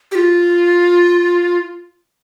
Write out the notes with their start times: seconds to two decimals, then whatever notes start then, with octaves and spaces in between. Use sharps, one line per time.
0.11 G4
0.15 F4